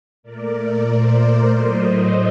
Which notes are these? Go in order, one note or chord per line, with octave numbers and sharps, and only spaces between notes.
A#2 A3 A#4 D5
A#4
C5
A#4 D5
A2 F#3 A3 C5 D#5